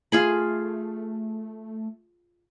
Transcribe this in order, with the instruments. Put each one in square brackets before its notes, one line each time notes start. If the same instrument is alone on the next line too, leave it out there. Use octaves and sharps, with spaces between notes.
[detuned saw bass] A3 [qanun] F4 G#4 B5